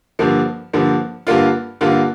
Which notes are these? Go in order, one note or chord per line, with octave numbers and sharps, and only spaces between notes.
G2 D3 F3 A#3
G2 D3 F3 A#3
G2 D3 A#3 F4
G2 D3 A#3 F4